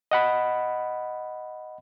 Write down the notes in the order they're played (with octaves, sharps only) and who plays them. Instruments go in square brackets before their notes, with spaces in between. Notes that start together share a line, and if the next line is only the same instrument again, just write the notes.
[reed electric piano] D#5 F#5 B5